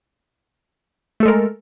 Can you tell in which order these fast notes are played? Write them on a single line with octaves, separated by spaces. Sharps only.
A3 A4 G#3 A#4